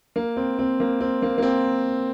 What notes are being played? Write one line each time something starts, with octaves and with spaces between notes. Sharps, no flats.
A#3
C4
C4
A#3
C4
A#3
A#3
C4